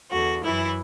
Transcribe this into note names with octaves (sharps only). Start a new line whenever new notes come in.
E2 D3 F#4
F#2 E3 E4